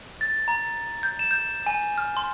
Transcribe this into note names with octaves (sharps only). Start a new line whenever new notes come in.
A6
A#5
G6
E7
G6
G#5
F6
C6